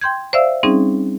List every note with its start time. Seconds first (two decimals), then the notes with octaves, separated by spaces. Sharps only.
0.01 G5 C6 G6 G#6
0.33 C5 D5 E5 F5 E6
0.63 G3 C4 C#4 D#4 G#4